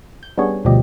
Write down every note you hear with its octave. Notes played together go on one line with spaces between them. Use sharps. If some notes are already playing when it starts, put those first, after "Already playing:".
G6
G3 B3 C#4 D4 G#4 C#5
D2 B2 F3 G3 G4 D#5